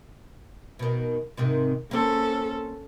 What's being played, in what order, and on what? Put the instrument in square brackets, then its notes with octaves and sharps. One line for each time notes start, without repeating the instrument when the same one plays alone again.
[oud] B2 D#3
G#2 C3 D#3
[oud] A#3 C4 [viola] C#4 A4